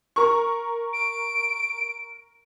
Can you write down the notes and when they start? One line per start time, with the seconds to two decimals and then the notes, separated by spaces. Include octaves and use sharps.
0.16 A#4 C#6
0.93 D7